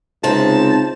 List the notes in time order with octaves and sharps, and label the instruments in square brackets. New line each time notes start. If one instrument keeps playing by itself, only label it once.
[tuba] C#2 [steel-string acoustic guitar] C3 C4 D#4 [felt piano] C5 [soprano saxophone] A5